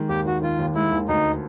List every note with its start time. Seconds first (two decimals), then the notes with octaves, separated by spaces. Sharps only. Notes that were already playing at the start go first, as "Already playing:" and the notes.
Already playing: D#3 G#3
0.09 D#2 G4
0.26 D#3 F#4
0.42 D#3 F4
0.59 D#2
0.75 G#3 E4
0.92 D#2
1.08 D2 D#4